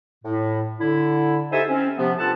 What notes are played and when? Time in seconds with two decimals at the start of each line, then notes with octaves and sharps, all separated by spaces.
0.24 A2
0.81 D3 E4
1.52 D#4 G4 A4 C5 E5 G#5
1.68 C4 C#4
1.98 C3 F3 B3
2.18 G2 F4 A4 F#5 A5